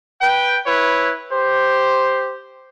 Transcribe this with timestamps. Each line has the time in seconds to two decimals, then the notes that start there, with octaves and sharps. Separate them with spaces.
0.21 B4 G5
0.65 E4 B4 C#5
1.32 G4 C5